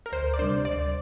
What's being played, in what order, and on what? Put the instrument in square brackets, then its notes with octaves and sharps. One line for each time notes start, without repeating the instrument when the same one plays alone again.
[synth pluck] A#4
[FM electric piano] D2 [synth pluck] C5
[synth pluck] D5
[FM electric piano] C3 G3 D4 [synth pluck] C5
[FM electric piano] D2 [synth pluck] D5